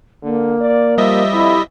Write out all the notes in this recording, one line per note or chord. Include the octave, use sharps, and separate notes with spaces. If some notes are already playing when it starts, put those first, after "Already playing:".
D3 A#3
D5
F3 G3 D#5 E5
F2 E4